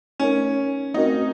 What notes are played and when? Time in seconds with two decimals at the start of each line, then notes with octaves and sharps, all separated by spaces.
0.20 A3 C#4 D#4 A#4
0.94 A3 C4 D#4 F#4 A#4